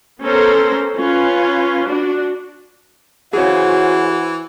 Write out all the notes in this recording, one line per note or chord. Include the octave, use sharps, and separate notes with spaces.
B3 C#4 A4 A#4 C5
C#4 F4 B4
D4 F#4
E3 F#4 G#4 C5 C#5